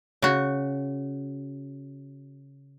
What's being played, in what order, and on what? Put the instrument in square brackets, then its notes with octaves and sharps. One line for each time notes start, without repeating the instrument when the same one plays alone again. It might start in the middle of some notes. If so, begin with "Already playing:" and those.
[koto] C#3 F#4